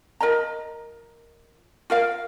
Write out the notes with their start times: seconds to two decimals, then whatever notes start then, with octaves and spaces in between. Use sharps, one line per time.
0.20 F4 A#4 D#5 A#5
1.90 F4 A#4 F5